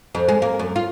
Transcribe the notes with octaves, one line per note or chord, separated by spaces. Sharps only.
F2
G#3
A#3
F#2
F4